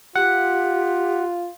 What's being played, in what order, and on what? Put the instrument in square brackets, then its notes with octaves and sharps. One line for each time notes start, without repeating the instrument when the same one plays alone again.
[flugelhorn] F4 [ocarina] G4 [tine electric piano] F#5